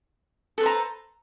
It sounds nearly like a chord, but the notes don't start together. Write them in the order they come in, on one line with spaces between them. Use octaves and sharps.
A4 B4 C5 A#5